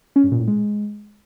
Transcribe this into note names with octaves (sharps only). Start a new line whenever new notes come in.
C#4
G2
A#2
A2
G#3